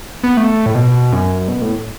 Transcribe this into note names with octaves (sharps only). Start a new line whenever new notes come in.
B3
A3
A2
B2
F#2
B2
A2